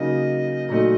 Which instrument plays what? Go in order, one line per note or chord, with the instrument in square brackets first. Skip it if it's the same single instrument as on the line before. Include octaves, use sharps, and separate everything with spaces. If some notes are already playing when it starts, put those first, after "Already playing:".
Already playing: [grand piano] C#3 F#3 A#3 D#4 [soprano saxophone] D#5
[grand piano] A#2 F#3 A3 D#4